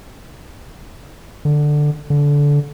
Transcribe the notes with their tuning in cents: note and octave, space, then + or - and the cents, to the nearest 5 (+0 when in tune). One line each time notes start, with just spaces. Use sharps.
D3 +10
D3 -20